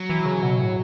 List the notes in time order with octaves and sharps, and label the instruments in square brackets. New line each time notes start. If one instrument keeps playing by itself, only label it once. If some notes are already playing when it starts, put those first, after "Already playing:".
Already playing: [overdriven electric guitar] F#3
[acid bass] E3
C#3
B2
A2